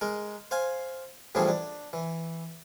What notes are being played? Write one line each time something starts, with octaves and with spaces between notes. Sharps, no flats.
G#3 A#4
C5 F5 G#5
A2 E3 F3 G3 D4 G#4
D4
E3